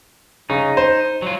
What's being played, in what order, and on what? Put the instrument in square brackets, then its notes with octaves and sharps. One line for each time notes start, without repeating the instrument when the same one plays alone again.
[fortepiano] C#3 [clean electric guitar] D#4
[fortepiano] C5
[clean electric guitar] F#3 F4